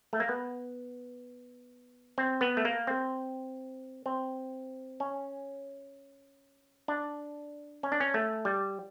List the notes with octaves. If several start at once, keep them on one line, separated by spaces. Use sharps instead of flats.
A3
A#3
B3
C4
B3
A3
A#3
C4
C4
C#4
D4
C#4
D4
C#4
A3
G3